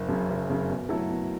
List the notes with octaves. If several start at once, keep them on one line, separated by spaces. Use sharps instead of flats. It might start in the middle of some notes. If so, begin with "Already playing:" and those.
Already playing: F#1
F#2 C#3
F#1
F#2 C#3
B2
F#3 A3 E4 A4
B2